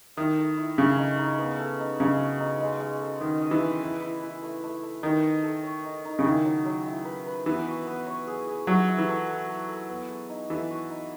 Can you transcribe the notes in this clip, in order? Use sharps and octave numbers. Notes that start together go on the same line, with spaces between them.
D#3 E4
A3
E4
C#3 A3
D#4
D#4
B3
A4
D#4
C#3 D#4
F#4
D#4
G#3
G#3
A4
D#3 D#5
D#5
E3
B4
E4
E4
E4
A3
A3
A3
D#3 D#4
D#5
A4
C#5
D#4
D#4
C#3
D#3 E4
F#3
F#3
E4
B4
B4
E3 B3
F#4
B3
C#5
G#4
G#4
F#3 E4
E4
E3
A4
A4
A4
A4
B3
G#4
D#4
E3 A4
F#4
D#4